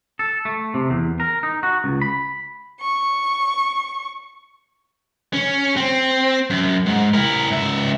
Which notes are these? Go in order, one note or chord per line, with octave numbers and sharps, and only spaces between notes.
A4
A3
C3
E2
A#4
D#4
F#4
C#2
B5
C#6
C#4
C4
F#2
G#2
E4 A#4
C#2 E5